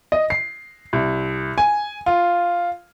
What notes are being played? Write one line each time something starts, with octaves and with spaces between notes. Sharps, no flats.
D#5
C7
C2
G#5
F4